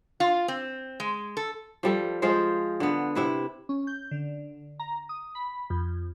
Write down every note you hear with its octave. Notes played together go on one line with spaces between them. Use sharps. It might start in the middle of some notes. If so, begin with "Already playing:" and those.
F4
C4
G#3
A4
F3 G3 A4
F3 G#3 F4 C5
D3 B3
C3 E4 B4
C#4
G6
D3
A#5
D#6
B5
F2